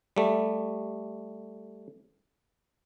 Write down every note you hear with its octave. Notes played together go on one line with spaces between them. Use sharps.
G3 A3